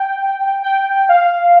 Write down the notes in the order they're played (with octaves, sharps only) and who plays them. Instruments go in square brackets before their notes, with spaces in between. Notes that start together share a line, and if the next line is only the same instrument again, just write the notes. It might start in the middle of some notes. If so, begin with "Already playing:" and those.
Already playing: [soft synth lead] G5
G5
F5